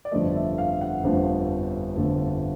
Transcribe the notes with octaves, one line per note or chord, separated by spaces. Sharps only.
D5
G1 F2 D3 F3 A3 D#5
E5
F5
F#5
G1 F2 D3 F3 A3
G1 F2 D3 F3 A3